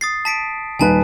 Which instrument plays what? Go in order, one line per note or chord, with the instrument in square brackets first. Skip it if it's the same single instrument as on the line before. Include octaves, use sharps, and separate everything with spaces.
[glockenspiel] D#6 A6 C7
A5 B6 D7
[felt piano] D#1 D#4 B4 [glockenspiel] G#5 A5